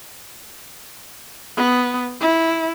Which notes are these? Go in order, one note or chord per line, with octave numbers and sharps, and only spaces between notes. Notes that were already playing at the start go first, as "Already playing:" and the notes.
B3
E4